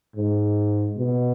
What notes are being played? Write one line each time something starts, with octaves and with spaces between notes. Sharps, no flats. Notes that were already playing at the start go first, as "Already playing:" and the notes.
G#2
B2